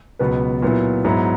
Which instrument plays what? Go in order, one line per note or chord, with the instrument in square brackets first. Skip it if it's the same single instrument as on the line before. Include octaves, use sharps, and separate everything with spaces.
[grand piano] C#2 B2 F#3 B3 B4
A#2 F#3 B3 E4
G#2 F#3 B3 E4